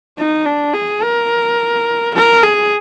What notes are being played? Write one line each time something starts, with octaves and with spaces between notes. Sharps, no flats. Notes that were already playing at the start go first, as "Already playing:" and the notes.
D#4
D4
G#4
A#4
A#4
G#4